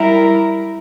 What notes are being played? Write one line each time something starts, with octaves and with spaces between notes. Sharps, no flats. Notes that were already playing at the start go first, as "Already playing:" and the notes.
Already playing: G3 E4 A#4